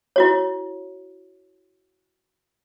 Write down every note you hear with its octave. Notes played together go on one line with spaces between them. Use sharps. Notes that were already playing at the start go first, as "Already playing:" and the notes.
E4 F#4 C#5